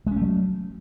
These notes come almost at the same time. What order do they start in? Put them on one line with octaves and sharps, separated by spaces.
G#3 C#4 A3 F#3